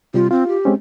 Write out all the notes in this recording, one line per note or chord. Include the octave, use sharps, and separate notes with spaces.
C3 G3 F4
C4 F4
G4
G#3 C4 C#4